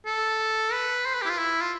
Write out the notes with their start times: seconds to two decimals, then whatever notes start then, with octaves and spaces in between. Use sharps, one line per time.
0.06 A4
0.72 B4
1.06 C5
1.14 B4
1.22 G4
1.26 E4
1.30 F4
1.38 E4
1.61 F4